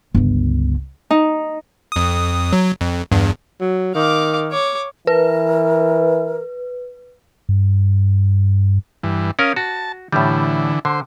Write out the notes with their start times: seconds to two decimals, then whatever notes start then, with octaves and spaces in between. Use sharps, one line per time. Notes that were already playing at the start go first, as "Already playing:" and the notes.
0.15 G1 C#2
1.10 D#4
1.92 F2 D#6
2.53 F#3
2.81 F2
3.11 E2 G2
3.61 F#3
3.95 D#3 F5 D6
4.52 C#5 D6
5.07 E3 A#4 B4
7.49 G2
9.03 G2 E3
9.39 C#4 A#4 F5 D#6
9.56 F#4 A5
10.13 A2 D3 E3 G3
10.85 D3 C5